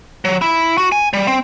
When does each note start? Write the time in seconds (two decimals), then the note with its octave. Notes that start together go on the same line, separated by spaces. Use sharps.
0.25 F#3
0.42 E4
0.78 F#4
0.92 G#5
1.13 G3
1.27 C4